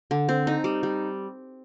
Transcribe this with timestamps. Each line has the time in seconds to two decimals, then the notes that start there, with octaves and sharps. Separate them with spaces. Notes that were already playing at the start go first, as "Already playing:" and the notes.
0.11 D3
0.29 C4
0.47 D#4
0.64 G3
0.83 G3